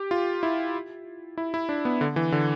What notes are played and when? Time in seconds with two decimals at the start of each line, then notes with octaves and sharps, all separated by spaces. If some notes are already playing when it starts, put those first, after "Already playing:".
Already playing: G4
0.11 F4
0.43 E4
1.38 E4
1.54 E4
1.69 D4
1.85 B3
2.01 D3
2.16 E3
2.32 D3